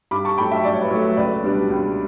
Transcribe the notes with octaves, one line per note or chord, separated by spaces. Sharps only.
G2 B5 D6
A5 C#6
F#3 A3 G5 B5
E5 G5
G2 D5
C#5
B4
F#3 A3 C#5
C#2 B4 D5
B2 G3 D4
C#2